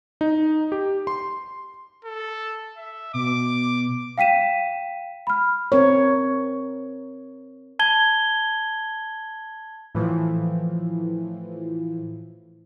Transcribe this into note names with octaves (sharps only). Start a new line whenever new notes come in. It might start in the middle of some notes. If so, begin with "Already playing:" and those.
D#4
G4
C6
A4
E5
B2 D6
F5 G5 B6 D#7 E7
B5 F6
C4 A#4 C#5
A5 G#6 G7
A2 E3 F3